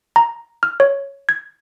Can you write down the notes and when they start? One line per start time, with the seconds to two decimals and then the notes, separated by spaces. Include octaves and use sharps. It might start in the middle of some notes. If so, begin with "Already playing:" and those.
0.16 A#5
0.63 F6
0.80 C#5
1.29 G#6